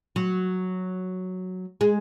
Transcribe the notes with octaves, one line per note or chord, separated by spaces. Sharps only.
F#3
G#3